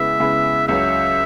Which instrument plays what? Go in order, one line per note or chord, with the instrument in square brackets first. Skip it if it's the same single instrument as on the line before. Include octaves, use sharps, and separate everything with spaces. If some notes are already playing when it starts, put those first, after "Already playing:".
Already playing: [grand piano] C#3 G#3 B3 E4 B4 [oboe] E5
[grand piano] C#3 G#3 B3 E4 B4
[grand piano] C#2 C#3 F#3 [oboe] E5